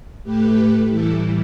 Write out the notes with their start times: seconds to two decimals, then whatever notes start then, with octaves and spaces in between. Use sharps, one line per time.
0.24 A2 A3 G4 B4
0.89 A2 E3 G3 E4 A4